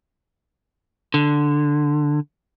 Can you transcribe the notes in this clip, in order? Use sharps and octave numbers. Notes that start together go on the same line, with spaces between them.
D3